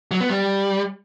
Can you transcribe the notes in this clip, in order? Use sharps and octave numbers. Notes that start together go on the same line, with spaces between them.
F#3
B3
G3